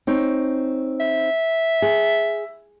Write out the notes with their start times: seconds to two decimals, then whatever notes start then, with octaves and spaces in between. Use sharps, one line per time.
0.07 C4 D#4 C#5
1.00 E5
1.82 G#4